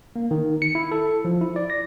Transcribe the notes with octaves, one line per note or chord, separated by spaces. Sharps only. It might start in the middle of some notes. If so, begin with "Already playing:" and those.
A#3
D#3
C#7
E4
A4
F3
E4
D5
A#6